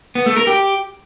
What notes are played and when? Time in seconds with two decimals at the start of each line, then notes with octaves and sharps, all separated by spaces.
0.15 B3
0.26 A3
0.36 A#4
0.47 G4